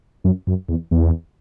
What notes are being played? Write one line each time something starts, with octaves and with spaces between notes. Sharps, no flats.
F#2
F#2
E2
E2